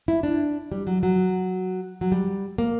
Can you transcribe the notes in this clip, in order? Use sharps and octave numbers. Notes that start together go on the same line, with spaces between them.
E4
D4
G3
F#3
F#3
F#3
G3
A#3